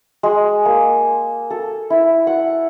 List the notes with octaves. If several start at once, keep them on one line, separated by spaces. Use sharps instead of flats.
G#3
A#3
A4
E4
F#5